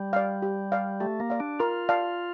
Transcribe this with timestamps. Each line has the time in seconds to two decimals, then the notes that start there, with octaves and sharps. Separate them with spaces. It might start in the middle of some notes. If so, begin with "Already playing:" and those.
Already playing: G3
0.13 D5 F5
0.42 G4
0.72 D5 F5
1.00 A3 G4
1.20 A#3
1.30 D5 F5
1.40 D4
1.60 F4 A#4
1.89 D5 F5 A5